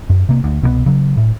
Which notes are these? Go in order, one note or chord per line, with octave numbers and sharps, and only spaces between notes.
F#2
C3 A#3
D2
C2 B2 F#3 B3
C#3 F#3
A2